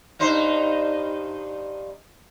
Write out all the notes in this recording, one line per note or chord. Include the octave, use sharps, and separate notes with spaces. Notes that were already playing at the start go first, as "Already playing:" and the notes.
G2 D#4 C5